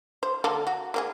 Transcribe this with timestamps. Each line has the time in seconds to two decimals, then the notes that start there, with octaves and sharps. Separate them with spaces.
0.23 C5
0.44 D3 A#3 A4
0.67 F#4
0.94 A#3 C4 G#4